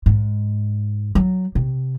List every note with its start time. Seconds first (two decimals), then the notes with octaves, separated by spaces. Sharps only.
0.06 G#2
1.15 F#3
1.55 C3